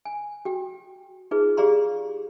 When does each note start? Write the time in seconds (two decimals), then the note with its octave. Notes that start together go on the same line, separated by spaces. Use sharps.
0.05 G#5
0.45 F#4 G5
1.31 D#4 F4 G#4 B4
1.57 G4 G#4 D5 F5 A#5 C6